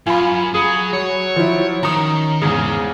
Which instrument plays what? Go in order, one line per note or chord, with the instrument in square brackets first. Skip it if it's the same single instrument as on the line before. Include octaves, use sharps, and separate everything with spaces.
[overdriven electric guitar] F#2 [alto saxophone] F4 [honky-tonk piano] G#5 B5
[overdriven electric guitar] F#3 [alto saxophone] G#4
[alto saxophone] F#3 [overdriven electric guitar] C#5
[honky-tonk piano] F3 E4
[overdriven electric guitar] D#3 [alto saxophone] C#4 [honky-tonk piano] A#5 D#6
[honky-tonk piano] E2 C#3 [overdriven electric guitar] G#2 [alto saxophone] G#4